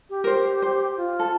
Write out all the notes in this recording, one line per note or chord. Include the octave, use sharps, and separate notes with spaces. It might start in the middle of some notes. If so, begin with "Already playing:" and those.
G4
A#4
C5
C5
F4
A4